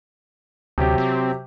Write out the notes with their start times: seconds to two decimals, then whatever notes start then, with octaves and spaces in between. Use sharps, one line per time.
0.78 D2 C3 F#3 G4
0.98 C4